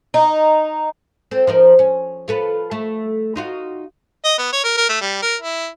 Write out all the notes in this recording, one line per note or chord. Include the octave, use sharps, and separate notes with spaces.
D#4
C4 A4
F3 D#4 A#4
C#4
F4 A4 B4
A3
D#4 F4 F#4
D#5
B3
C#5
A#4
A#4
A3
G3
A#4
E4